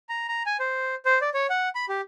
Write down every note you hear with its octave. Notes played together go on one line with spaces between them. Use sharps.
A#5
A#5
G#5
C5
C5
D5
C#5
F#5
B5
G4